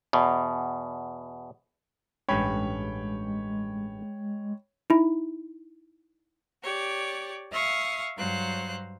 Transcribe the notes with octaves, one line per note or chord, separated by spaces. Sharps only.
E2 B2
A1 G2 G#3 C#4 C#5 G5 B5
D#4 E4
G4 C#5 D5
E5 F5 C#6 D#6 F6
G2 F#3 C5 F5 F#6